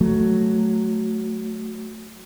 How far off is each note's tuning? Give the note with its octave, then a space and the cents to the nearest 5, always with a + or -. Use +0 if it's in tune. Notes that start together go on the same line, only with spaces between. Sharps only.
F#3 +0 A3 +0